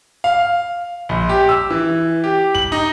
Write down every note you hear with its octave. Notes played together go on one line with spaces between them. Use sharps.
F5
A#1
G4
E6
E3
G4
F#7
D#4